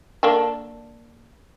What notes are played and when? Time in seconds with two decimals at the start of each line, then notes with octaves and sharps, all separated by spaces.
0.23 A#3 D4 A4